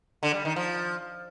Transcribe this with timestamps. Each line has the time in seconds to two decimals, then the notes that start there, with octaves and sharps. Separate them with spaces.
0.23 D3
0.34 G3
0.45 D#3
0.56 F3